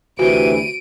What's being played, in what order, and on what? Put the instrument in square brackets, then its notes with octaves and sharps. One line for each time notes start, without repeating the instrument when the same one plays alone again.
[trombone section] D2 C3 [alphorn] E3 [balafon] F#4 [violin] D7 D#7